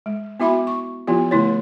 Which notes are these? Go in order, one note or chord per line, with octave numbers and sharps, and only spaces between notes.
G#3
B3 E4 F#4 E5 B5 D6
C#6
F3 B3 E4 F4 G4
D3 A3 E4 C#5